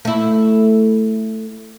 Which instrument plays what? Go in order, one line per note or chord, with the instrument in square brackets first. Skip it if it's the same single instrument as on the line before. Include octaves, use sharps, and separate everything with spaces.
[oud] A3 E4